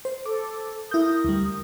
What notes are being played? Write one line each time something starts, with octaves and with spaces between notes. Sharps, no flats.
C5
A4 D6
E4 A#4 D#6 G6
D2 G3